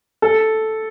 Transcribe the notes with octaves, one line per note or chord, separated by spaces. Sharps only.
A4